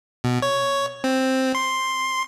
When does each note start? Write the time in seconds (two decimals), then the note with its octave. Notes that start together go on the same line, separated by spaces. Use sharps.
0.24 B2
0.42 C#5
1.04 C4
1.55 C6